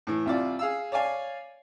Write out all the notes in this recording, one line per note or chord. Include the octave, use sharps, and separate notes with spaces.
A2 E3
C2 F4 D5
G#4 F5 E6
C#5 D5 F5 G#5